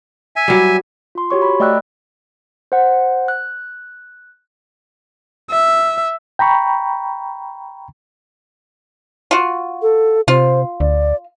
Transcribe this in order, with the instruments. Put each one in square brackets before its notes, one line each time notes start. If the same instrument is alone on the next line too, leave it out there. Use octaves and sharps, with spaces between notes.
[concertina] E5 G#5
[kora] F#3 G3
[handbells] F4 C6
F#4 G4 C#5 C#6
B5
A3 D5 D#5 G5 E6 F#6
C5 F#5
F#6
[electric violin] E5
[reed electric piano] G5 A#5 B5 C#6
[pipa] F4 F#4
[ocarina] A4
[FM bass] C3 [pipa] F4 [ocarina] C5
[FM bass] D2 [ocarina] D5